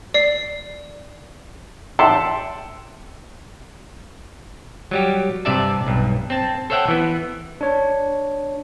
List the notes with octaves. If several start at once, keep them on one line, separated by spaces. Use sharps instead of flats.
D5 C7
E5 F#5 G5 A5 C6 E6
F#3 G3 G4
G2 C3 D5 E5 A5
B1 G2
C4 A5
A4 C5 C#5 E5 F#5 G5
E3 B3
D4 C#5